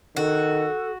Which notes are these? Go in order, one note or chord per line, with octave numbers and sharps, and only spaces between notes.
D#3 F#4 A4